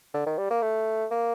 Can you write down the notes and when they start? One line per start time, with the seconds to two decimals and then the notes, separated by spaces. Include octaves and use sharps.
0.14 D3
0.27 D#3
0.38 G3
0.51 A#3
0.62 A3
1.11 A#3